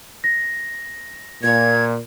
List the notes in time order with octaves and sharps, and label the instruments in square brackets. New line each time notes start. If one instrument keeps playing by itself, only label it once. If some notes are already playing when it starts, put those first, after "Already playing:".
[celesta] A#6
[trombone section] A#2 [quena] G#6